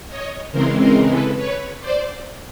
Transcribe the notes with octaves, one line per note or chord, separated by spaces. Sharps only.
C#5 D#5
C#3 E3 G#3 C4 A#4 C5
A#4 C5
A4 B4
B4 C#5
C5 D5